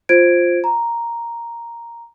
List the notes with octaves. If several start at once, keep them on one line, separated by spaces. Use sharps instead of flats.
F4 C5 G#6 D7
A#5